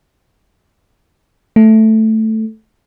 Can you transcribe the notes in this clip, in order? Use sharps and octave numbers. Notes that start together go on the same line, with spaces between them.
A3